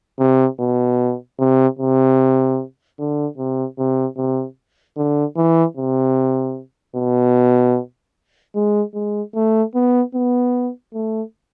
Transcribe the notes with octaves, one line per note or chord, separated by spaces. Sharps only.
C3
B2
C3
C3
D3
C3
C3
C3
D3
E3
C3
B2
G#3
G#3
A3
B3
B3
A3